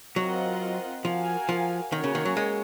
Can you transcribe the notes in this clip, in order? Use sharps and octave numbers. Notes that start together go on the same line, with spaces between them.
F#3 C4 F4 A#4 D#5 F#5
F3 F#4 A#4 F5 G#5
F3
D#3 A#3 C#4 F#4 A#4 C#5
C#3
D#3
F#3
G#3